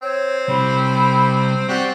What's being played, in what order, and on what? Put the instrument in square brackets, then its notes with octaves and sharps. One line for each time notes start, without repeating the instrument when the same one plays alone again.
[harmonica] C4 [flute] C#5
[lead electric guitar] C3 G3 [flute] B5
[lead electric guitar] C4 [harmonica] F#4 G4 [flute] D5